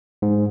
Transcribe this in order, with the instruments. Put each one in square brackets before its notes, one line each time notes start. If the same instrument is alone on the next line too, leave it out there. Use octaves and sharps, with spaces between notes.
[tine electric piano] G#2